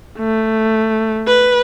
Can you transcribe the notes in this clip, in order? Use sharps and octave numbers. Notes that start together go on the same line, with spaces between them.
A3
B4